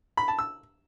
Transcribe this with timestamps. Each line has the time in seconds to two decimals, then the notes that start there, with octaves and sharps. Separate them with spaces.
0.17 B5
0.28 A5
0.39 E6